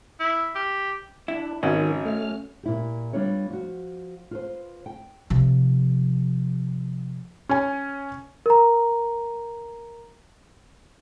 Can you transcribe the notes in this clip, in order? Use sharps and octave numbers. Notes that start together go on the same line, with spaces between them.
E4
G4
D4 E4
G#1 D#3 C#4 F#4
A3 F6
A#2 E4 G4
G3 B3 D4 F4 C#5
F3 F#4
F4 B4 C5
G5
C3 F3
C#4 G#5
A#4 A#5